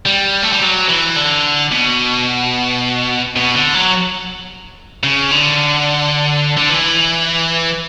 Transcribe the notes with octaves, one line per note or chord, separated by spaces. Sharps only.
G3
A3
G3
F#3
E3
D3
B2
B2
D3
F#3
C#3
D3
D3
E3